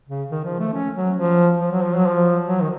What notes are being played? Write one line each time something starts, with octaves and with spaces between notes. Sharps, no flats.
C#3
D#3
F3
A3
C#4
F#3
F3
F3
F#3
F3
F#3
F3
F#3
D#3